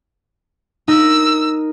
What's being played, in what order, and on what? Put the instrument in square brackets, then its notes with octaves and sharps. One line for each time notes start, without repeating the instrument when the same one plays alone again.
[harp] D#4 A#4 [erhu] E6